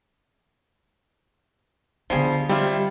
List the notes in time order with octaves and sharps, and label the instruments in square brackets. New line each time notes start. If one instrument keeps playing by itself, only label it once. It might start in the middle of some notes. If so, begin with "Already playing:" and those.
[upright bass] D3 B3 [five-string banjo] F3 G3 G#4
[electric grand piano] G3 [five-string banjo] C4 E4 F4